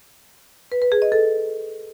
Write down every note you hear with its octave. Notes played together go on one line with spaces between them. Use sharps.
B4
B4
G#4
D#5
A4